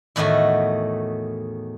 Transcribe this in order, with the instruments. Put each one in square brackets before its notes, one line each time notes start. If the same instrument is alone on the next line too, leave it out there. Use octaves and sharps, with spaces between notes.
[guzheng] E2 A2 D#3 A3 F#4